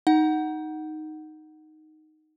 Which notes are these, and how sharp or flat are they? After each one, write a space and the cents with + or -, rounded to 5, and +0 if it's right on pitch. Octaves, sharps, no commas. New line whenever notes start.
D#4 +0 F#5 +10